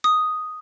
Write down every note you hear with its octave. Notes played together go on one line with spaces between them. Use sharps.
D#6